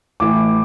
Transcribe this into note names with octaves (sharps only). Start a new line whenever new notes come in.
A1 A2 E3 A3 D6